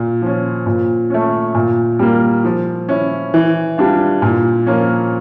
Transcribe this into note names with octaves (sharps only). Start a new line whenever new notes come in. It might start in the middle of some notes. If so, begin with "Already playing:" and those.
Already playing: A#2
F3 C#4
A#2
A3 C#4
A#2
G3 A#3
F3
C#4 E4
E3
G3 D4 F4
A#2
F3 A#3 C#4